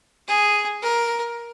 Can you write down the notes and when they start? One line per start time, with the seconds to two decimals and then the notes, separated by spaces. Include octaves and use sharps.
0.28 G#4
0.82 A#4